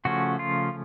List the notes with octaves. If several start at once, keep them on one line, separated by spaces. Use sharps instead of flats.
C#3 F3 A3 C#4 F#4
F4